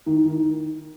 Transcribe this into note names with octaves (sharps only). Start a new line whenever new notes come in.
D#3
D#3